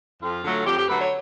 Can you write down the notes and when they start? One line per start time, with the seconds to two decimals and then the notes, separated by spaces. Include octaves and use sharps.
0.22 F2 F4
0.44 D3 F#3 A3
0.66 F2 G4
0.77 G4
0.88 D3 F#3 A3 B4
0.99 C#5